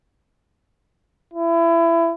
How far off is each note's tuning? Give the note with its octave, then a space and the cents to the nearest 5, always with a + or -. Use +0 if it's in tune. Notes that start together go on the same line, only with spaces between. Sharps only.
E4 +25